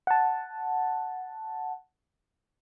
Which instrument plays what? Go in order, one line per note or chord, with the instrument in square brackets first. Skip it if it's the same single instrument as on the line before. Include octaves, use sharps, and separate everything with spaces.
[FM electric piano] F#5 A5